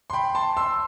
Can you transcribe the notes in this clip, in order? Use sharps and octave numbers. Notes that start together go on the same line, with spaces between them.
C6
G5 B5
A5 C6
C6 E6